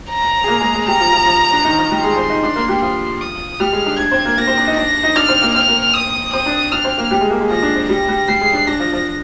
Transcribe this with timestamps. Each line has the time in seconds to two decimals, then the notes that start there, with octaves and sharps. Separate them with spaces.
0.09 A#5
0.44 G#4
0.48 A#3 A#4
0.60 G#3 G#4
0.74 G#3 G#4
0.87 G3 G4 A#5
1.00 F3 F4
1.13 F3 F4
1.26 F3 F4
1.52 D4
1.65 D#3 D#4
1.77 F3 F4
1.91 G3 G4
2.04 G#3 G#4 C6
2.12 D5
2.17 C4 C5
2.30 D#4 D#5
2.43 D4 D5
2.56 A#3 A#4
2.68 G3 G4
2.82 F3 F4 C6
3.21 D#6
3.60 G3 G4 F6
3.73 G#3 G#4
3.86 D4 D5
3.98 D4 D5 G#6
4.11 C4 C5
4.25 A#3 A#4
4.38 A#3 A#4 A#6
4.47 C4 C5
4.58 D4 D5
4.67 D#4 D#5
4.76 D4 D5 A#6
5.03 D#4 D#5
5.16 D4 D5 F6
5.29 C4 C5
5.42 A#3 A#4
5.54 C4 C5 F6
5.68 A#3 A#4
5.93 D#6
6.33 C4 C5 D#6
6.46 D4 D5
6.72 D4 D5 F6
6.85 C4 C5
6.98 A#3 A#4
7.11 G3 G4
7.21 G#3 G#4
7.30 A#3 A#4
7.41 G#3 G#4
7.50 F3 F4 A#6
7.63 D4
7.76 C4
7.89 G3 G4 A#6
8.08 G3 G4
8.28 G3 G4 C7
8.41 G#3 G#4
8.53 D4
8.67 D4 A#6
8.79 F3 F4
8.93 F3 F4